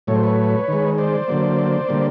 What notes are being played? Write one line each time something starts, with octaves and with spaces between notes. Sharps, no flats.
A2 F#3 A3 C#5
C5
B4 C#5
D#3 G#3
C5 D5
D3 F#3 A#3
D3 G3 A#3